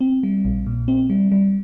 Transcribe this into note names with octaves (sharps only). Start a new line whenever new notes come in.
C4
G3
A#1
A#2
C4
G3
G3